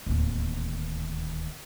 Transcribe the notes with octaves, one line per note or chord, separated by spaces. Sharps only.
D1 D#2